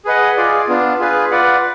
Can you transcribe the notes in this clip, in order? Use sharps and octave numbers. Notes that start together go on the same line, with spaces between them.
G#4 B4 D#5 F#5
F4 G#4 D5
B3 D4 F4
F4 G#4 B4
F4 B4 D5 F#5